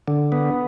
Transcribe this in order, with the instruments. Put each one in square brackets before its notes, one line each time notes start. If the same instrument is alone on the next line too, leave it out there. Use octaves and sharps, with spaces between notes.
[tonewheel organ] D3
B3